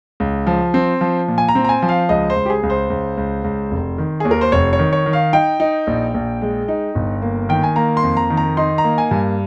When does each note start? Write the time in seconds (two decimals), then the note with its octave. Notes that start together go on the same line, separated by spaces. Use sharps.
0.20 C#2
0.47 F3
0.74 C4
1.01 F3
1.28 A#2
1.38 G#5
1.48 A#5
1.55 C4
1.64 A#5
1.69 G#5
1.82 F3
1.89 F5
2.09 C#2 D#5
2.30 C5
2.36 C#2
2.46 G4
2.50 G#4
2.63 C#2
2.70 C5
2.90 C#2
3.17 C#2
3.44 C#2
3.71 F1
3.98 D#3
4.20 D#2 G#4
4.31 A#4
4.41 C5
4.52 F1 C#5
4.73 C#5
4.79 D#3
4.93 C#5
5.06 D#3
5.13 F5
5.33 D#4 G5
5.60 D#4
5.87 A#1
6.14 A#1
6.42 G#3
6.68 D#4
6.95 G1
7.22 A#3
7.49 D#3 G5
7.63 G#5
7.76 A#3 A#5
7.97 C6
8.03 F2
8.17 A#5
8.30 D#3
8.37 A#5
8.57 D#4 C6
8.78 A#5
8.84 A#3
8.98 G#5
9.11 G2